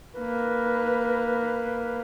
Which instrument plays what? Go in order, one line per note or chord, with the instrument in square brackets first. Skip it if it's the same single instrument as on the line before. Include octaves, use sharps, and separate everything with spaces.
[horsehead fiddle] A#3 B4